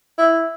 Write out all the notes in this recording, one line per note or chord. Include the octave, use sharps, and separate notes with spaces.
E4